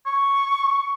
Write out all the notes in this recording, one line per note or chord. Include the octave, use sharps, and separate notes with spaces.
C#6